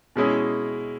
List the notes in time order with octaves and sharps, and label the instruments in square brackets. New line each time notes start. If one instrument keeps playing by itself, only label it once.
[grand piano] B2 G#3 C#4 E4 G#4